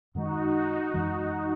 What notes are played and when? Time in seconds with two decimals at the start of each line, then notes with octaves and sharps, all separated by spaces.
0.15 F#2 D#3 G#3 D#4 F#4
0.94 F#2 E3 G#3